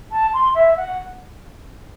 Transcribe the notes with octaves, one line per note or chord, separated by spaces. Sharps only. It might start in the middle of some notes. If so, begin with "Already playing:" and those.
A5
C6
E5
F#5